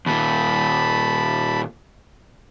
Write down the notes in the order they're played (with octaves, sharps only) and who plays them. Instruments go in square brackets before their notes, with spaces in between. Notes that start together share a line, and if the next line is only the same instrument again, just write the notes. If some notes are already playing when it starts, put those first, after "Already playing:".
[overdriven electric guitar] D#2 A#2 [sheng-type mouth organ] A5 B5